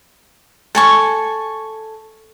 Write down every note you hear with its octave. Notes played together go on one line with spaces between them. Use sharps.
A4 G#5 C#6